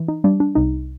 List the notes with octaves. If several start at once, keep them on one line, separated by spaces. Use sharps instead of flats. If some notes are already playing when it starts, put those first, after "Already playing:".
Already playing: E3
D#4
G3 D4
D4
C2 D#4